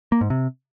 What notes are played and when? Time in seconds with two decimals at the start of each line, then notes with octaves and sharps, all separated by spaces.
0.12 A#3
0.21 G#2
0.30 C3